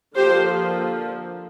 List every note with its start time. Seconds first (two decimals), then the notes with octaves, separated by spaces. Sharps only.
0.16 D3 F3 A#3 G4 C5